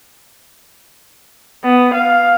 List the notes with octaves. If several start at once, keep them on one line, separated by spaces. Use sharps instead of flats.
B3
F5